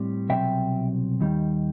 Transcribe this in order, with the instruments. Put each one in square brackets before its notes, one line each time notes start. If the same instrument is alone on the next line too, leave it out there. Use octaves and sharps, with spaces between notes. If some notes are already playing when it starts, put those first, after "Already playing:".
Already playing: [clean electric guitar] A2 G3 C4
C2 B2 F#3 C4 E5 G5
D#2 D#3 G3